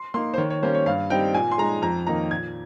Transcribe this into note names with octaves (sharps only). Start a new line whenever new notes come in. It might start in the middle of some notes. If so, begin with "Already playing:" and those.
Already playing: C6
A#3 D#4 C6
C5
D#3 C#5
C#5
G3 A#3 C#4 C5
C#5
G2 F5
G3 C4 D#4 G5
A#2 G#5
C6
G#3 D#4 A#5
F2 A#5
D#3 A#3 D#4 A#5
A#2 G#6